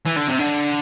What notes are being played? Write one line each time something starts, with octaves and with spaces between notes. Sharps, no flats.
E3
D3
C3
D3